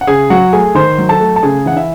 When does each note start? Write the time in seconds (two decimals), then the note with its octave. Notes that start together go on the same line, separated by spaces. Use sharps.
0.01 F#5
0.07 C#3 G#4 G#5
0.30 F#3 F#4 F#5
0.53 A3 G#4 G#5
0.75 D#3 C5 C6
0.98 F#3
1.09 A4 A5
1.20 A3
1.36 A5
1.43 C#3 G#4 G#5
1.66 E3 F#5
1.76 E4 E5